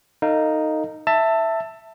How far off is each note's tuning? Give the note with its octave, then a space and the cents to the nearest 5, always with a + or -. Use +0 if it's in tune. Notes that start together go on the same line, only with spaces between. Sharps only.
D#4 +0 A4 +40 F5 +0
E5 +0 A5 +20